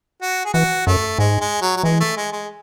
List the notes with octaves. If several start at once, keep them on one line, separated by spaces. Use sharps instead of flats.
F#4
G#4
E3 F#4
F#2 A3
G#2 G#3
G#3
F#3
F#3
E3 G#3
A3
G#3
G#3